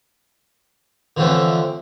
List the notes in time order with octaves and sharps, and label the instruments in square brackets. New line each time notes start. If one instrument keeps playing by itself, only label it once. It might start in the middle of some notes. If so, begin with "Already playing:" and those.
[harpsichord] D3 E3 F3 A3 C4 C#4